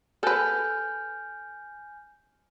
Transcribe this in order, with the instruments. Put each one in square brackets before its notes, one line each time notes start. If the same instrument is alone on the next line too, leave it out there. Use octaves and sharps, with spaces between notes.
[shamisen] A4 B4 [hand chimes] G#5 F6 G6